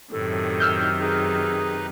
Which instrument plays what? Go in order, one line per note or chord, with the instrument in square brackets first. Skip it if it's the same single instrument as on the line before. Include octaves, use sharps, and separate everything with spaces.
[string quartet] F#2 C3 D#3 [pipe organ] A2 [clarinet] A4
[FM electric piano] E6 F6 G6
[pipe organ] D#4 B4 [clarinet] G#4